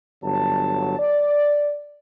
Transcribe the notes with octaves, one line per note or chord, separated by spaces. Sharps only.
G1 F#3 A5
D5